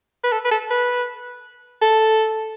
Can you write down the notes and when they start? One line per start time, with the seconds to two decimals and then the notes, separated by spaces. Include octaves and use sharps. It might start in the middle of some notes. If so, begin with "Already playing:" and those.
0.24 B4
0.32 A4
0.45 B4
0.52 A4
0.70 B4
1.82 A4